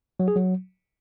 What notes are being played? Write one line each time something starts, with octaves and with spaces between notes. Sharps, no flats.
F#3
G#4
F#3